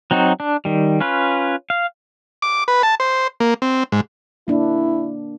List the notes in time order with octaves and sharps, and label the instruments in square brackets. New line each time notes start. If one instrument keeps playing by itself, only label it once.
[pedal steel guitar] F#3 C4 D#4 F#4
D4
D#3 G3
C#4 F4 B4
F5
[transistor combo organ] D6
B4
A5
C5
A#3
C4
G#2
[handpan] A#3 D4 [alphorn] E4